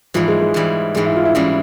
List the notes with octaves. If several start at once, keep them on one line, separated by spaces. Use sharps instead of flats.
G#2 E3 F3 G3
G#3
G#3
G#2 E3 G3
G#2 E3 G3 G#3
E4
F4
E4
G#2 E3 G3 C#4